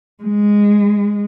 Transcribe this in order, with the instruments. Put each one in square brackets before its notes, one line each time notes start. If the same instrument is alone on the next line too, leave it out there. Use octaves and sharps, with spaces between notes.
[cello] G#3